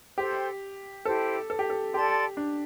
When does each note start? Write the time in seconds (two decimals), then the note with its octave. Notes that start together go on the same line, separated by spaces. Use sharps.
0.18 G4 A4 C5 G5 C6
1.05 E4 G4 A4 C5
1.50 A4
1.59 G4
1.70 A4
1.94 G4 A4 D5 A5 C6
2.37 D4